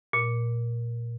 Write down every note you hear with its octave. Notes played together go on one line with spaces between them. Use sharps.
A#2